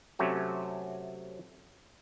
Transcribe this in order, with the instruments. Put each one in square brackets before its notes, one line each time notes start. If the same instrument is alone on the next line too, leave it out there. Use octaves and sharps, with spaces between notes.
[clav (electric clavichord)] C3 F#3 A3 C#4 F#4